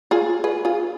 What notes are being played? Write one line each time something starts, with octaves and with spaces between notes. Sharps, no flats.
F4 G#4
G#4 B4
F4 G#4